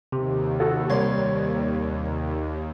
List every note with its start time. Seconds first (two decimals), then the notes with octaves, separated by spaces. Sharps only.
0.12 D#2 C3
0.60 F#4 A4
0.90 C2 C#5 D5 C6